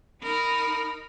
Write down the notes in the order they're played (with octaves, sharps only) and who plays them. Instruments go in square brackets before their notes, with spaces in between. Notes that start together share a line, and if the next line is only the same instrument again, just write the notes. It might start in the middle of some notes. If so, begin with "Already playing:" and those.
[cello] D#4 A#4 [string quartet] B5